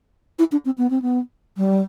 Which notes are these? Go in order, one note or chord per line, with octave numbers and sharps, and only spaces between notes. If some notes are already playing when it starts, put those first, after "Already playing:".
E4
D4
C4
B3
C4
B3
G3